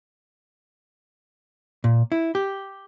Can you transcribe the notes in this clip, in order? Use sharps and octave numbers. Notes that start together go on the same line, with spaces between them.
A#2
E4
G4